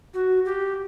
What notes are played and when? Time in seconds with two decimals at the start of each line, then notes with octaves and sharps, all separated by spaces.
0.14 F#4
0.45 G4